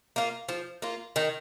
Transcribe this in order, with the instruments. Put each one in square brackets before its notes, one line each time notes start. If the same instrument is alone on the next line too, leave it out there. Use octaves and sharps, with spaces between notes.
[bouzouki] A#3 F4
F3
A#3 F4
D#3